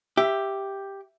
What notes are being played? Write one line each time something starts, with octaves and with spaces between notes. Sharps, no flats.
G4 E5